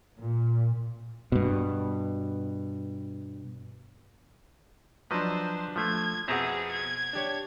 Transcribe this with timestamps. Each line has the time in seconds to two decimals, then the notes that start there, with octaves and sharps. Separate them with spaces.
0.18 A#2
1.32 G2 B2
5.11 F3 F#3 D4 B4 C5 D#5
5.76 F3 A3 F4 G#6
6.28 F2 B2 C4 G#4 E5 F#5 A#5
6.71 G#6
7.13 D4 G4 C#5